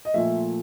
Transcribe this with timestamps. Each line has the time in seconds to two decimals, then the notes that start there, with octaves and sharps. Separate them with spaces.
0.05 D#5
0.14 A#2 F3 A3 E5